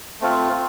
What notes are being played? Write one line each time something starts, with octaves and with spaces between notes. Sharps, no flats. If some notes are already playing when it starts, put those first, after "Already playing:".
A3 C4 F4